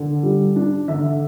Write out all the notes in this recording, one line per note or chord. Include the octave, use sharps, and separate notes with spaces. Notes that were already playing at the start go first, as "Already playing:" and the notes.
Already playing: D3
G3
D4
D3 E5